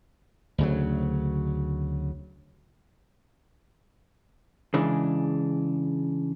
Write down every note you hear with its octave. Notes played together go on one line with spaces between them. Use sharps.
D2 C#3 F#3
C#3 E3 G#3 D4